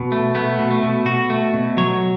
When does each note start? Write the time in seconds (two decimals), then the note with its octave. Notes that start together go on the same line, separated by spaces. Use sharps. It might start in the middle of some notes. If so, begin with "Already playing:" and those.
Already playing: B2
0.12 A3
0.35 A3 B3
0.59 B2
0.71 A3
0.83 B2
1.06 B2 F#4
1.30 A3
1.54 B2
1.77 F#3 C#5